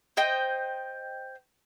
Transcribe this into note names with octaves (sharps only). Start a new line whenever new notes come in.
C5 D#5 G5